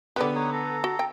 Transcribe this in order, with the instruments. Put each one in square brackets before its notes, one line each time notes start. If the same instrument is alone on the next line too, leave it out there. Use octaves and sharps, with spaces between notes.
[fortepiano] D3 B3 B4 [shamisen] G4 D5
[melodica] D#4 C#5 D#6
A4 A#5
[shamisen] F#4
G5